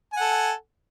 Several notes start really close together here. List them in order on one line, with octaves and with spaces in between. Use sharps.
G#5 F#5 A4